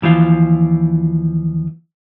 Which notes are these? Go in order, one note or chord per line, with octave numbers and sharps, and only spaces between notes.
D#2 E3 F3 F4